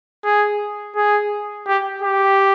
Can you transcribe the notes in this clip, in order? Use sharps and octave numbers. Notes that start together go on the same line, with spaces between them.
G#4
G#4
G4
G4